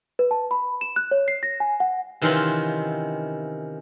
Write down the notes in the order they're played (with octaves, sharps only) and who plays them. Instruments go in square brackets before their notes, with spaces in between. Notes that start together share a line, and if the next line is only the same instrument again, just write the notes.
[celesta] B4
A5
B5
E7
F#6
C#5
C7
A#6
G#5
F#5
[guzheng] C3 D#3 E3 C4 C#4 F4